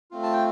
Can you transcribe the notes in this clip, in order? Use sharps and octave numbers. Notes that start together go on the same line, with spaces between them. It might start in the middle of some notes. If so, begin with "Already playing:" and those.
A3 C4 F4
A5
G5